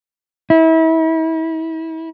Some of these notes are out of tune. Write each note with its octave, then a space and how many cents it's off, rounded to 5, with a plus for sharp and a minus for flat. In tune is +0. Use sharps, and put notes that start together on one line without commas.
E4 -35